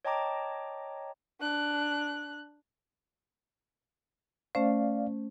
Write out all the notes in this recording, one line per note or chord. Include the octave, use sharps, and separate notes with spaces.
C#5 D#5 G5 A5 A#5 D6
D4 F#6
A3 C#4 C5 D5 F5